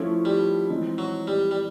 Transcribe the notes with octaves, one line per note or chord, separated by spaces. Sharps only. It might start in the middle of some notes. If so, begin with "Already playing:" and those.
Already playing: F3 A3 C#4 E4
G3
E3 G#3 C4 D#4
F#3
G3
G3